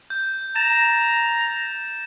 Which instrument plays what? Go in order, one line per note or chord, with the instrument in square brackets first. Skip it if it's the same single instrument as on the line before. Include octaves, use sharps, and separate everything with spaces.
[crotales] G6
[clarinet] A#5 [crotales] A6 E7